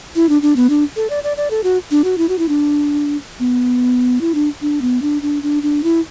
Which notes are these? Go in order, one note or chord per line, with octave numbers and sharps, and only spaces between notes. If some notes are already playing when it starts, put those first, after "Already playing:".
E4
D4
D4
B3
D4
A4
D5
D5
D5
A4
F#4
D4
F#4
E4
F#4
E4
D4
B3
E4
D4
D4
B3
D4
D4
D4
D4
E4